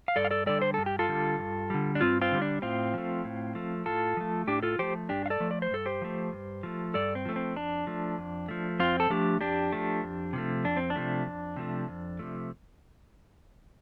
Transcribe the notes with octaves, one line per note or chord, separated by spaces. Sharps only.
F5
G2 A4 D5
F5
A4 D5
D3 G3 A4 D5
C5
G2 A4
G4
F4 A4
D3 G3
G2
D3 G3
D4
G2 C4 F4
C4 F4
D3 G3
D4
A2 C4 F4
F3 A3
A2
F3 A3
A2 F4 A4
F3 A3
A2 D4 G4
F4 A4
F3 A3 G4 C5
G2 D4 G4
F5
A4 D5
F3 A3
D5
C5
G2 A4
G4 C5
F3 A3
G2
F3 A3
G2 A4 D5
C4
F3 A3
C4
F2 D4
F3 A3
F2
F3 A3
F2 C4 F4
A4
F3 A3 D4 G4
F2 D4 G4
F3 A3
F2
C3 F3 A3
F2 D4
C4
D4
C3 F3 A3
F2
C3 F3 A3
F2
C3 F3 A3